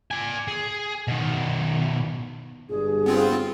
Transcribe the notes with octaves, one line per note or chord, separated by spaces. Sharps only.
D5 G#5
G#4
B2 D#3
G1 G2 G#4
B3 C4 F4